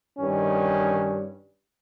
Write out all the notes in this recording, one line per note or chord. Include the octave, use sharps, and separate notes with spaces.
G2 D#3 C#4